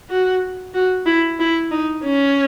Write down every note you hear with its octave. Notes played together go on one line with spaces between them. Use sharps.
F#4
F#4
E4
E4
D#4
C#4